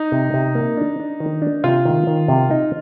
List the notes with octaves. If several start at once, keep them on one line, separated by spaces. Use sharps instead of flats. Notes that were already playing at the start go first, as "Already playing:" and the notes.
Already playing: D#4
C3
C3
A#3
D4
D4
D#3
D4
C3 F4
D#3
D#3
C3
D#4